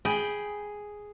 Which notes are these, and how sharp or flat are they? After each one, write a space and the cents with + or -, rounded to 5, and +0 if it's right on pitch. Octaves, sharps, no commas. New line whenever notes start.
G#4 +0 G5 +0 B5 +0